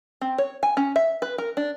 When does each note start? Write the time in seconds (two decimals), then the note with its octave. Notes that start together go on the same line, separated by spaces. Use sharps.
0.21 C4
0.38 C#5
0.63 G#5
0.77 C#4
0.96 E5
1.22 B4
1.38 A#4
1.57 D4